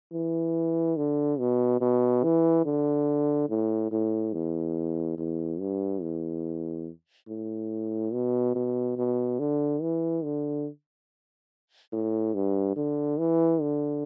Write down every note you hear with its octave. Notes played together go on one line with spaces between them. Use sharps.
E3
D3
B2
B2
E3
D3
A2
A2
E2
E2
G2
E2
A2
B2
B2
B2
D3
E3
D3
A2
G2
D3
E3
D3